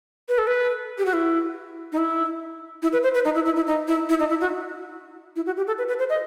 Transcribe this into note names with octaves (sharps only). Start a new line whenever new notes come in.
B4
A4
B4
G4
F#4
E4
D#4
E4
E4
B4
C5
B4
D#4
E4
E4
E4
D#4
E4
E4
D#4
E4
F#4
E4
F#4
G4
A4
B4
B4
C5
D#5